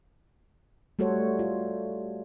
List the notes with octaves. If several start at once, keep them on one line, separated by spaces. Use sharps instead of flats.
G3 A3 F#4 A4 C5 C#5
F4